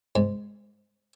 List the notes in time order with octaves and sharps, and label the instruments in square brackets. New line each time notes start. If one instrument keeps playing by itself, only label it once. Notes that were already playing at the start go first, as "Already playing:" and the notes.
[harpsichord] G#2